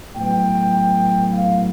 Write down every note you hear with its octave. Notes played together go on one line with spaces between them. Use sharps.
A2 F#3 B3 G5
F5